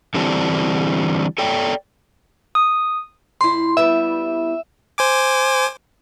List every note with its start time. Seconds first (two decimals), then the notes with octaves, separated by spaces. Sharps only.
0.14 D3 E3 G3 C4 D4
1.38 A4 C#5 D5 G5
2.55 D#6
3.41 F2 E4 C6
3.77 G3 B3 E4 E5
4.98 C5 G#5 D6